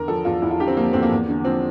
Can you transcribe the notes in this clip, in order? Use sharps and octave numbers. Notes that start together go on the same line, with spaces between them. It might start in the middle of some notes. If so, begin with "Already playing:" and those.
Already playing: E2 D3 A#4
F3 A4
E2 F4
E2 E4
F4
D3 G4
C4
F3 A#3
E2 C4
A#3
E2
D3
F3 C4